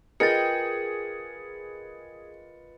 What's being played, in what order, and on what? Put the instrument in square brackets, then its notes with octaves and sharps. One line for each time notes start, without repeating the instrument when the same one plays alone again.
[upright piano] F4 B4 D#5 [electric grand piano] G#4 [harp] A#4 G5 [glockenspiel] A6 C#7